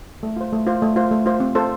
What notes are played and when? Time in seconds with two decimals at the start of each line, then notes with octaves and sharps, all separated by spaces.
0.23 A3
0.37 F4 C5
0.53 A3
0.67 F4 C5
0.82 A3
0.96 F4 C5
1.11 A3
1.26 F4 C5
1.40 C4
1.55 F4 A4 C5